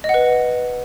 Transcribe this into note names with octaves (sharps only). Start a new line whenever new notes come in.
D#5
F#5
B4